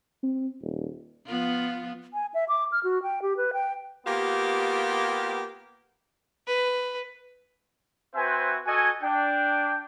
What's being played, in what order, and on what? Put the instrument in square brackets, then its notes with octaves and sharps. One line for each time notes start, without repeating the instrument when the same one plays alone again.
[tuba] C4
D#1
[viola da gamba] F3 B3 F4
[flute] G#5
E5
D6
F6
F#4
G5
G4
B4
G5
[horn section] A#3 B3 F4 G4
[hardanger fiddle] B4
[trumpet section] C4 F#4 B4 C5 E5 G#5
F#4 A4 D#5 G#5
D4 G5